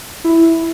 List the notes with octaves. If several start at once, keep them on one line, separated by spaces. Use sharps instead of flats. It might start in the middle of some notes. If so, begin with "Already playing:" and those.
E4